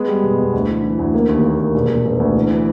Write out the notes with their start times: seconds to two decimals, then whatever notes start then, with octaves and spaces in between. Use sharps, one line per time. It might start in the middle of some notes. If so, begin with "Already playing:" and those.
Already playing: G#3 B3
0.08 G3
0.24 B2
0.38 B2
0.53 D2
0.69 E3
0.83 E3
0.99 D2
1.14 A#3
1.29 D#2
1.45 A#3
1.59 A#3
1.74 E1
1.89 E1
2.05 E1
2.20 D2
2.35 E3
2.51 E3